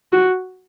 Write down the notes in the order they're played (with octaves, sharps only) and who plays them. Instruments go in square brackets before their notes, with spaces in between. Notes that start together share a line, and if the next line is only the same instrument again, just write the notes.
[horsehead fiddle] F#4